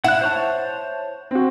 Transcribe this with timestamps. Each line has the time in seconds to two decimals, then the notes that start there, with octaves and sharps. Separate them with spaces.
0.04 E4 F#5 F#6
0.21 C5 C#5 A5
1.31 C4 F#4